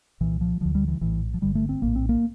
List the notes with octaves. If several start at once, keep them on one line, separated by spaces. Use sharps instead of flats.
C2 A#2 E3
F3
D2 D3 F3
G3
E3
A#1 A2 E3
F3
G1 G2 D3 G3
A3
C4
A#1 A2 A#3
C4
A#3